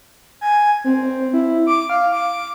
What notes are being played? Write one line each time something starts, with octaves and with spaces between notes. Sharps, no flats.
G#5
C4
C4
E4
D6
F5
D6